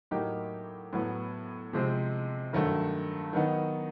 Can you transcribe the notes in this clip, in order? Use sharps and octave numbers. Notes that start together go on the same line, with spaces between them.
A2 F#3 A#3 D#4 G4
A2 F#3 B3
C3 F3 G#3 C4
G2 D#3 F#3 A3
D#3 F#3 B3 D#4 F#4